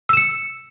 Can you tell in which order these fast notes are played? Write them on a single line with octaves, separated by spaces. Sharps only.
E6 E7 C#7